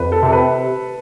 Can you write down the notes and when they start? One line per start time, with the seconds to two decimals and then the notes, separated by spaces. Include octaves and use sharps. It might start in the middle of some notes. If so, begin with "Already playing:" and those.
Already playing: F2 B4
0.12 A4
0.22 C3 A4
0.33 B4